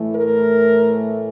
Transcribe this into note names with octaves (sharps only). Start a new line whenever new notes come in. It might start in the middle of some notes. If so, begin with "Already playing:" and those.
Already playing: A2 E3 A3
A#4